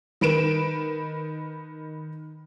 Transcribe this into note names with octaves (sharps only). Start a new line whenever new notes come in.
D#3 B4 D7 E7